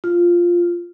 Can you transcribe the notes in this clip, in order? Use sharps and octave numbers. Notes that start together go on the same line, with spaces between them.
F4